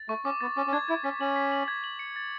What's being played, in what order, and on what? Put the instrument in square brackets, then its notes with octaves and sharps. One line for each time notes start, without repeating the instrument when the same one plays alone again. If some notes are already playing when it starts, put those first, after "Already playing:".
Already playing: [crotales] A6
[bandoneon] A3 [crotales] C#6
[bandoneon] C#4 [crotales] D6
[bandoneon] B3 [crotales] A6
[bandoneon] C#4 [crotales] D6
[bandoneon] C#4
[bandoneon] D4 [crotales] G#6
[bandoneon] E4 [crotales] G#6
[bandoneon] C#4 [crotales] B6
[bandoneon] C#4 [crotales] F#7
[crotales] B6
F#7
G#6
F#7
C#7
A6